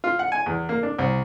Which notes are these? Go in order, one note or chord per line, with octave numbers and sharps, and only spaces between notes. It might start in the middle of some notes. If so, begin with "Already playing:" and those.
F4
F#5
G#5
E2
A#3
D4
C2